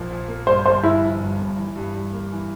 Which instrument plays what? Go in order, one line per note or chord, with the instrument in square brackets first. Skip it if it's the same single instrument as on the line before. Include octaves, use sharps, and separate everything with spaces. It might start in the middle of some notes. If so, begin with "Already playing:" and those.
Already playing: [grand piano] A#1 A#2 F3 A#3
A#2
A#3
[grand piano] G2 [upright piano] C5
[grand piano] G1 [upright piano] C5
[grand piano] G1 [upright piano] E4
[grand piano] F3
G2
G1
E3
G2
G2
A#3
E3